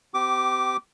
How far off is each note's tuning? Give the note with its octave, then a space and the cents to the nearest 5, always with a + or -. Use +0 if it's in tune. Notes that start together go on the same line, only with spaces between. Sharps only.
C4 -35 G4 -20 D6 +0